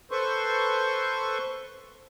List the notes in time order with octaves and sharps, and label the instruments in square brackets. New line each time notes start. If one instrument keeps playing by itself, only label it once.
[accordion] A4 B4 C5 C6 C#6